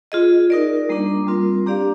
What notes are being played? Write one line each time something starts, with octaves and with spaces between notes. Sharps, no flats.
F4 G#4 D#5
D#4 A#4 D5
G3 A#3 D4
G3 C4 F4 A#4
A#3 D4 G4 D5 F5